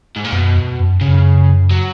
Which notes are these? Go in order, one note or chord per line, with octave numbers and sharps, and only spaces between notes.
G#2
A#2
F#2 B2
E2
F#2
F#2 C#3
F#3